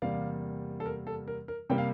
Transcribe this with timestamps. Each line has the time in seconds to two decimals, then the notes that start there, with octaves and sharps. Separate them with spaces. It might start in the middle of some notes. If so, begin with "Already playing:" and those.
0.02 E2 C3 G3 A#3 D5 F5
0.80 A4
0.86 A#4
1.07 A4
1.28 A#4
1.48 A#4
1.70 C3 G3 A#3 G5
1.78 F5